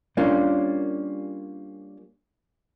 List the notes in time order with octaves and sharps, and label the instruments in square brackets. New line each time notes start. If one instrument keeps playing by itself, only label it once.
[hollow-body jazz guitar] G3 A#3 C#4 D4 F4